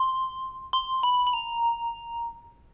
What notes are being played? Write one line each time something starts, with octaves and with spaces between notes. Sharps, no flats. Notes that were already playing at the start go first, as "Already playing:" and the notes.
Already playing: C6
C6
B5
B5
A#5